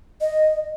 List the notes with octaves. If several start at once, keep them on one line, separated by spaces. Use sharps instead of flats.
D#5